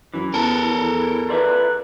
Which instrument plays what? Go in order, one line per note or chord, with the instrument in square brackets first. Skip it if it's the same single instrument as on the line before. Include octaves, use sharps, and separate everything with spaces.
[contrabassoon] F#2 [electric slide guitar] E3
[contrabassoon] E2 [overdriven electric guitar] A4 A#4
[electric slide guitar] F4 D5 E5 [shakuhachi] B4